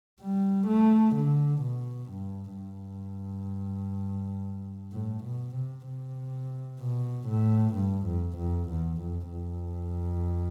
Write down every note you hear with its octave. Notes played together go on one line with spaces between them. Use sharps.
G3
A3
D3
B2
G2
G2
A2
B2
C3
C3
B2
A2
G2
F2
F2
E2
F2
F2